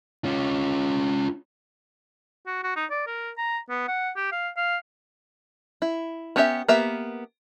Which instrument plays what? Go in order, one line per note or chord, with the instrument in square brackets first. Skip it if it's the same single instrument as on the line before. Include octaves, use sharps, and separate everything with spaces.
[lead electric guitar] C#4 F4
[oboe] F#4
F#4
D#4
D5
A#4
A#5
B3
F#5
G4
F5
F5
[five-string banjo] E4
B3 C#4 G4 B4 E5
A#3 B3 G4 E5